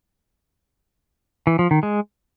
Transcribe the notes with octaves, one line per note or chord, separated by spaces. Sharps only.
E3
F3
D#3
G#3